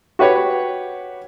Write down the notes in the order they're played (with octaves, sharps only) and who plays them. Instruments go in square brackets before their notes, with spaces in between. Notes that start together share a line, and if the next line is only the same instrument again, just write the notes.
[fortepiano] F#4 G4 B4 C#5